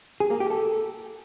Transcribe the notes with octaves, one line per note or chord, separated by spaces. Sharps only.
G#4
A#3
G4
A4